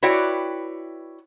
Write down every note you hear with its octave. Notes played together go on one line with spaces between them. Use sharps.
E4 F#4 B4 C#5 D5 G5